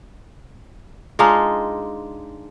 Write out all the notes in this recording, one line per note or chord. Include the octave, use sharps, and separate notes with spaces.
G#3 D4 D#4 F4